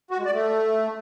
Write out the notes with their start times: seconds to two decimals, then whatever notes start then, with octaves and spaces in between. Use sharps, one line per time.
0.11 F#4
0.18 G#3
0.25 D5
0.33 A3